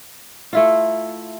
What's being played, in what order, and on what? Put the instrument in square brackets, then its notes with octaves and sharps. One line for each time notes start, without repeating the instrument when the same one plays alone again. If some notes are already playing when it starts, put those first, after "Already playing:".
[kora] A3 E4 F4